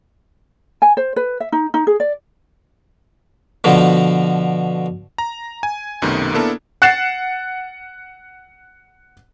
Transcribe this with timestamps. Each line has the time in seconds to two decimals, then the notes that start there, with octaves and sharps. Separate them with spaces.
0.82 G#5
0.97 C5
1.16 B4
1.40 E5
1.52 D#4
1.74 D#4
1.87 G#4
2.00 D5
3.64 B2 D3 F3
5.18 A#5
5.63 G#5
6.02 B1 F#2 C3 D#3 A3 B3
6.34 A#3 B3 D4 E4 A4 A#4
6.82 F#5 F#6 A6 C7 E7